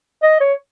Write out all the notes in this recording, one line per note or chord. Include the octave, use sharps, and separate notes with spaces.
D#5
C#5